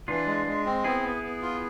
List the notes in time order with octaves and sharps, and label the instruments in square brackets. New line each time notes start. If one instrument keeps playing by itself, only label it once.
[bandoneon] E3 [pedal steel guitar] D4 F4
[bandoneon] G#3
G#3
C4
[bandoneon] B3 [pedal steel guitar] E4 G#4
[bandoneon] B3
B3
F4